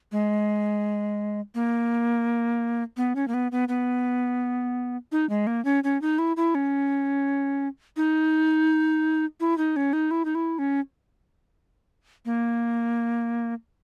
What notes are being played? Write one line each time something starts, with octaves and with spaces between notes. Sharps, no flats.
G#3
A#3
B3
C#4
A#3
B3
B3
B3
D#4
G#3
A#3
C#4
C#4
D#4
E4
E4
C#4
D#4
E4
D#4
C#4
D#4
E4
D#4
E4
C#4
A#3